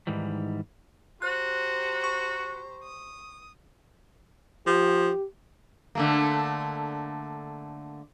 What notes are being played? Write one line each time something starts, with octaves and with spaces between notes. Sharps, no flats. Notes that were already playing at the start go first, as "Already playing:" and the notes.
G#2 D#3 E3 G3
F#4 G4 C5 A#5 F#6
C#6
D#6
F3 G4
D3 A3 A#3